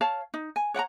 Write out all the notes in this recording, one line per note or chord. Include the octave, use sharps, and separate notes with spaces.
C#5 F5 A5
D#4
G#5
C#5 F#5 G5 A#5